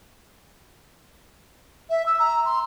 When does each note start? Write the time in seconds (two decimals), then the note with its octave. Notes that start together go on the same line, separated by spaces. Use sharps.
1.89 E5
2.06 E6
2.19 A#5
2.45 C6